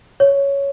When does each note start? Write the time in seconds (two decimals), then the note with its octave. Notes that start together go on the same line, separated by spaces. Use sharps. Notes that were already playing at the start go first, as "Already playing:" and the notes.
0.20 C#5